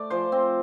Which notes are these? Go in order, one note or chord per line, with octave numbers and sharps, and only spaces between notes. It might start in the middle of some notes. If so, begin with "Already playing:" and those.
Already playing: A3 D5
F3 C5
C4